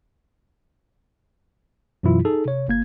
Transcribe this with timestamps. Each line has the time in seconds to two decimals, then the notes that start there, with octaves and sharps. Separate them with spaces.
2.03 F#2 B2 E3 F#3 E4 F4
2.25 D#4 G#4 A4
2.45 C3 C#5
2.68 G1 A#3 G#6